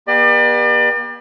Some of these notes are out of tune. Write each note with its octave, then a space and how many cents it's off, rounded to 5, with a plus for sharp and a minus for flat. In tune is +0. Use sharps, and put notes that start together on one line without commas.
B3 -40 G4 +30 D5 +35